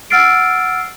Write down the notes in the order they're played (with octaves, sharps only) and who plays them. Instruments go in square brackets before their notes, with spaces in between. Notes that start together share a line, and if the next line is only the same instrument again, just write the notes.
[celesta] F#5 E6 F6 A6 C7 D7